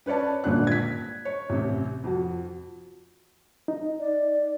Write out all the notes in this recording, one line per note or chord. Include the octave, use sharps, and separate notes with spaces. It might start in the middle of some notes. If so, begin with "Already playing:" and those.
C#4 B4 C#5 D5 A5
D#1 G#1 A#2 D3 D4 F#6
G#6 B6
C#5
A1 C3
F2 F#4
D#4
D5